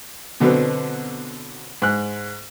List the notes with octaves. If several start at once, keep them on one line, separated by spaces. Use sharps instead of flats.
B2 D3 F#3 B3 C4
G#2 F#6